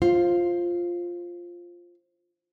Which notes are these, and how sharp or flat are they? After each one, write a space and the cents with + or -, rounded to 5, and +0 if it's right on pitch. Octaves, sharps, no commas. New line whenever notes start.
F4 +0 C5 +15